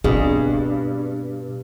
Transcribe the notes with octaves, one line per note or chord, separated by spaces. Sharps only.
G2 B2 C4 G#4